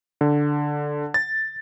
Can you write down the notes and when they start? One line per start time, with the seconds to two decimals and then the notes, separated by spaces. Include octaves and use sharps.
0.21 D3
1.14 A6